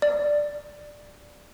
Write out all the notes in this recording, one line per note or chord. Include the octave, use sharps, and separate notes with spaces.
D5